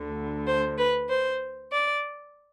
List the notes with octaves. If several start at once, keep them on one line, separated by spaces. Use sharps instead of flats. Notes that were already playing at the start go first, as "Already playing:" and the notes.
Already playing: D2 D3
C5
B4
C5
D5